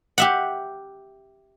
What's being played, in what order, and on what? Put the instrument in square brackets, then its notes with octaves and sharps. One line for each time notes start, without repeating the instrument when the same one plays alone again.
[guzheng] G4 E5 F#5